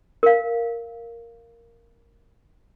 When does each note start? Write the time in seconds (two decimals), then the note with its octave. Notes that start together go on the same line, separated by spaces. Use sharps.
0.23 A#4 F5